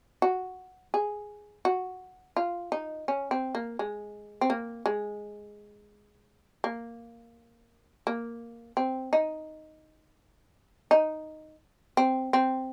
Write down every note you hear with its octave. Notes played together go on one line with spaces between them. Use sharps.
F#4
G#4
F#4
F4
D#4
C#4
C4
A#3
G#3
C4
A#3
G#3
A#3
A#3
C4
D#4
D#4
C4
C4